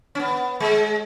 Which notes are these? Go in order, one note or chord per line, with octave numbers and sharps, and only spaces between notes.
C#4
B3
G#3